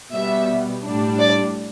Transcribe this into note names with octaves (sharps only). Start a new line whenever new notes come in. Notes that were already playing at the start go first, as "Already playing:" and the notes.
B2 G3 B3 E5
A2 G3 D4
D5